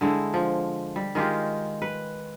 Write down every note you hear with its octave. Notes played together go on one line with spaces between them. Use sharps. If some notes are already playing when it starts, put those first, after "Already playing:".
D3 G#3 E4
F3
G3
D#3 G#3 F4 G4
B4